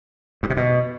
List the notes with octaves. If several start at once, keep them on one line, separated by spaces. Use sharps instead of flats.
G2
C3
B2